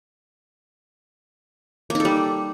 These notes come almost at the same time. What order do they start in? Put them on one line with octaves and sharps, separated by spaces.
A#3 D#4 A4 G3